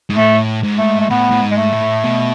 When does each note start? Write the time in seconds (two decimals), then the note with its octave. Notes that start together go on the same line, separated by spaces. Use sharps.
0.10 G#2
0.17 A2 A3
0.63 G#2
0.79 A3
1.01 A3
1.10 A2 B3
1.30 A2
1.41 G#2
1.51 G#3
1.57 A3
1.72 A2
2.04 B2